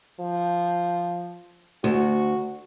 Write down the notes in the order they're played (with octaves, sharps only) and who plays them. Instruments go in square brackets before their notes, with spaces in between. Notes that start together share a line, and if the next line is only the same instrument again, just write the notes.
[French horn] F3
[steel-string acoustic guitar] D2 [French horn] F#4